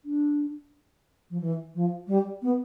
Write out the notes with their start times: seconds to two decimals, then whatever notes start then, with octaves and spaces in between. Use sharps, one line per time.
0.05 D4
1.30 F3
1.40 E3
1.75 F3
2.07 G3
2.42 B3